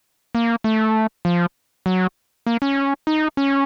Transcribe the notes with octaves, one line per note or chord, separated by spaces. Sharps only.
A#3
A3
F3
F#3
A#3
C#4
D#4
C#4